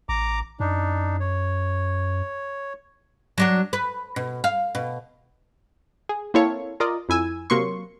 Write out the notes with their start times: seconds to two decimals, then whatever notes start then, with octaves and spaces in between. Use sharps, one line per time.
0.09 A1 A#5 D6
0.60 F#2 D4 D#4
1.20 C#5
3.38 F#3 D4 F#4
3.73 B4
4.16 B2
4.44 F5
4.75 B2
6.09 G#4
6.34 A#3 C4 E4 A4 C#5 F5
6.80 F4 A#4 D5 D#5
7.09 F2 E4 G#5 E6
7.50 C3 F#3 A#3 C6 C#6